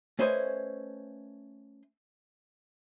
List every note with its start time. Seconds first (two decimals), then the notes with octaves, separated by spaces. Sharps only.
0.19 A3 C#4 B4 C5 D#5 G#5